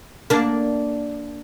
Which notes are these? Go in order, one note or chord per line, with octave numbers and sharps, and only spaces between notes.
A#3 D4